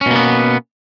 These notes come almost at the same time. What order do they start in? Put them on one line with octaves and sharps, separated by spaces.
C#4 B2 A#3 B3